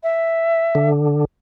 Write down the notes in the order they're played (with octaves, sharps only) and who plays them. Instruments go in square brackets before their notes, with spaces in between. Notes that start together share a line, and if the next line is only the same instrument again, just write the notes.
[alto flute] E5
[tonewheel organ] D3